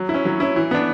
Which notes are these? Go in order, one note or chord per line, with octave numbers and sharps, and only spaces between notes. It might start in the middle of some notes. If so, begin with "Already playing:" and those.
Already playing: F#3
C#4 E4
F#3
C#4 E4
E3
B3 D4